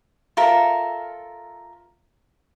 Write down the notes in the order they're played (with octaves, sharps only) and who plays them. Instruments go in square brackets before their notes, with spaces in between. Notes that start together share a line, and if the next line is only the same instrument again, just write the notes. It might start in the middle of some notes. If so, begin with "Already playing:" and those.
[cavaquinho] F4 A4 A#4 E5